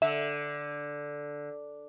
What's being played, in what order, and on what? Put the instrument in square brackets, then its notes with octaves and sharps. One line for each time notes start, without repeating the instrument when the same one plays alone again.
[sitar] D3 [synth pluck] E5